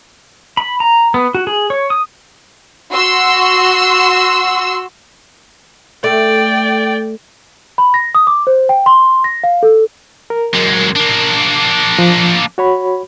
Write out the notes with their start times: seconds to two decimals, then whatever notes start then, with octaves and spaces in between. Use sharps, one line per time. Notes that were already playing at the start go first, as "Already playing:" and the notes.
0.57 B5
0.80 A#5
1.14 B3
1.35 F#4
1.47 G#4
1.70 C#5
1.90 D#6
2.92 F#4 C6 E6
6.04 A3 D5 G5
7.78 B5
7.94 A#6
8.15 D#6
8.27 D6
8.47 C5
8.69 G5
8.86 C6
9.24 A#6
9.44 F5
9.63 A4
10.30 A#4
10.54 F#2 G#3
10.96 A#3 D4
11.99 F3
12.58 F#4 C#5 B5